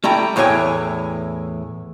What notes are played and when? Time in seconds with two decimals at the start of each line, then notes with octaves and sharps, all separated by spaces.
0.04 G3 A3 E4 G5 A#5
0.36 E2 A2 E3 C#5 G5 G#5